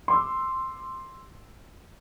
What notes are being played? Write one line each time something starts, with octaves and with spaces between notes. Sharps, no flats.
C6 D6 E6